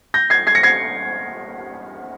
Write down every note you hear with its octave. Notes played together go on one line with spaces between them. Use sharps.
G6 A#6
G#6 C7
G#6 C7
A#6 C#7
G#6 C7